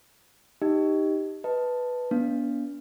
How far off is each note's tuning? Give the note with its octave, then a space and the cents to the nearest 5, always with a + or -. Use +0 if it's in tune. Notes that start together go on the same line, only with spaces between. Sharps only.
D#4 +0 G4 +0 D#5 +0
B4 +0 D#5 +10 A5 +0
B3 -30 D4 -40